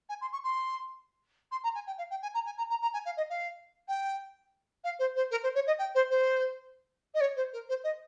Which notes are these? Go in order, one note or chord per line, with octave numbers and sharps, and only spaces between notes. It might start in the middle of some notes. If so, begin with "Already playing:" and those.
G#5
C6
C#6
C6
C6
A#5
G#5
G5
F5
G5
G#5
A#5
G#5
A#5
A#5
A#5
G#5
F5
D#5
F5
G5
F5
C5
C5
A#4
C5
C#5
D#5
G5
C5
C5
D#5
C#5
C5
A#4
C5
D#5